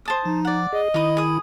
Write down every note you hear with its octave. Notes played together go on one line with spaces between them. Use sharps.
C5 A5 D#6
F3 D#4
D5 F#5
G#4 D#5
D#3 D#4 E4 B5 D#6
G#4 D#6